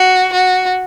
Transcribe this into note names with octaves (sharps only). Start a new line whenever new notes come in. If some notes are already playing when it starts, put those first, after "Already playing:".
Already playing: F#4
F#4